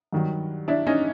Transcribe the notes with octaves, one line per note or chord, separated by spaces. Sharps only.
G2 D#3 F#3
D4 E4
C#4 D#4